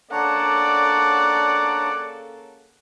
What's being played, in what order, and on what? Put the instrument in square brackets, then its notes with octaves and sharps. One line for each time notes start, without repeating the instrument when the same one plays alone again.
[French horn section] C#3 A#3 A4 [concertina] D4 C#5 A#5 [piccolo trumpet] D5 [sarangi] F#5